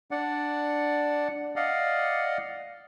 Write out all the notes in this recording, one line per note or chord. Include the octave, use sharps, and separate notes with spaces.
D4 D5 F#5
D5 D#5 F5 F#5